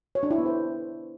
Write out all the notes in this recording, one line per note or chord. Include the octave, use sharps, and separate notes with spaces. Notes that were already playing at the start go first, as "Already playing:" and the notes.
C#5
D4
E4
B3
C5